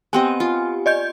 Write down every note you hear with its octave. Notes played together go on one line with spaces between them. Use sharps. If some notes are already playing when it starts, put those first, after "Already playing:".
B3 C4 G4 D#5 G#5
F4
D5 D#5 G6